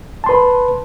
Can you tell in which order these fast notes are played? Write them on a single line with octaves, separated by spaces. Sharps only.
A5 C6 B4